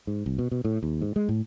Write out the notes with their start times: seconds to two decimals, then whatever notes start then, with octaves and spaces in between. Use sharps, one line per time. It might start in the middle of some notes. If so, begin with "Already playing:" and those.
0.07 G#2
0.26 C2
0.38 B2
0.51 B2
0.65 A2
0.83 D#2
1.01 G#2
1.16 G#3
1.29 A2